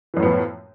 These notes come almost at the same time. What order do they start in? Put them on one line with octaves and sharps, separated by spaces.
E3 F#2 A2 B3 F3